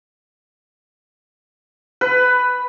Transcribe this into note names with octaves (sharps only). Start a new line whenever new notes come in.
B4